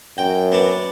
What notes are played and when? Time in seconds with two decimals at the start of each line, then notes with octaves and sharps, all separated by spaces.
0.18 F#2 G5
0.52 B3 D4